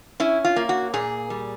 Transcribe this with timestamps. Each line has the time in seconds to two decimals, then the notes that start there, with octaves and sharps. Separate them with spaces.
0.20 C#4 E4
0.44 F4
0.56 A#3
0.69 F#4
0.94 A#2 G#4
1.30 G3